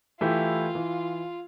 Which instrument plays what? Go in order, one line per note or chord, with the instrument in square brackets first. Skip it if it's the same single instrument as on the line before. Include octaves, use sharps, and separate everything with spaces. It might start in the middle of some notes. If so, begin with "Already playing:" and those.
[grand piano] E3 A3 E4 G4 [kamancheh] F4
[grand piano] E3